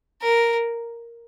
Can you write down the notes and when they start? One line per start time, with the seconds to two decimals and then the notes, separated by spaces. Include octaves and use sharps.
0.22 A#4